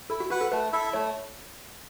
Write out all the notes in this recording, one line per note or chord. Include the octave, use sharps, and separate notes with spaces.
E4 A4
F#4
F#4 B4 F#5
A4
A3 B4
E4 A4 E5
A3 C#5